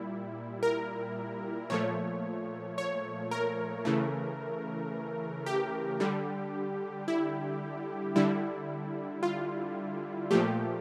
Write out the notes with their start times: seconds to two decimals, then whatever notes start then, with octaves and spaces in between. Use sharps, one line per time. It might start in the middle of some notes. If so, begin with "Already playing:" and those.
Already playing: A#2 G3 E4
0.63 A#4
1.70 A#2 F3 A3 C#5
2.78 C#5
3.31 A#4
3.85 C#3 E3 A3
5.46 G4
6.00 D3 G3
7.08 E4
8.16 D3 G3 E4
9.23 F4
10.31 A#2 F3 A3 G4